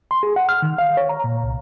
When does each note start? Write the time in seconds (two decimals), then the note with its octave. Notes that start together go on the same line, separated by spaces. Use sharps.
0.11 C6
0.23 G#4
0.36 F#5
0.49 F6
0.62 D#3
0.78 F5
0.97 C#5
1.09 A#5
1.24 A#2
1.44 C2